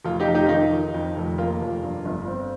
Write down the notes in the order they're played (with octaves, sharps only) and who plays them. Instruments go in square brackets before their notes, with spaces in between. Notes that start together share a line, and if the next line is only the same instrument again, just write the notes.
[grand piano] F1 F4
D#4 G4
F1
D#4 G4
F4
D#3 D#4
D#3
F2
F1
A#3 F4
F1
G2
G1
C4